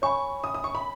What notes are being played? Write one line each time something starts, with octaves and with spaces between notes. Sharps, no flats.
C#5 G#5 B5 C#6
D#6
D#6
C#6
B5